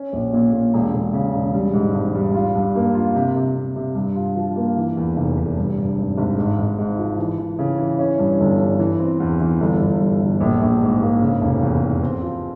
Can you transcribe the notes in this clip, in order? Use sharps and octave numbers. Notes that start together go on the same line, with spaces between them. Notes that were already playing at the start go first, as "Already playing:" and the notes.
Already playing: C#4
A#1
A#2
A#2
E1
E1
C#3
E1
G3
G#2
G#1
G3
F4
G2
A#3
F4
C3
C3
C3
C3
G2
F4
F3
A#3
E3
E2
F1
F1
G2
G2
G#1
G#1
G#2
G#1
G#2
F3
E3
E3
C#3
E3
C#4
G2
G1
G2
E3
C4
E2
E3
G1
G1
G2
G1
A#1
A#1
G#2
A#3
C#3
F1
E2
F1
C4
F3